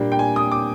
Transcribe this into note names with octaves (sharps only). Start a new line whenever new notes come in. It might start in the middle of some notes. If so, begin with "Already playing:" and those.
Already playing: A#2 G3 A#3 D4 G5
G5
G#5
D#6
D6